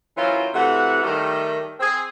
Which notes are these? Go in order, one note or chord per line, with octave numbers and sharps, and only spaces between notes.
E3 F#3 C#4 F4 A#4 C5
C3 E3 A3 F#4 F#5
D#3 G3 A3
C4 G#4